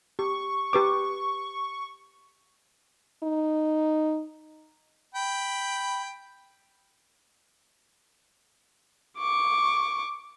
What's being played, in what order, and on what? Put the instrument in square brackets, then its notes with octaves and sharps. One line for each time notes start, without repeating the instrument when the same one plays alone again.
[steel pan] G4 [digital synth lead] C#6
[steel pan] G4 B4 D6
[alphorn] D#4
[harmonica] G5 B5
[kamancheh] C#6 D6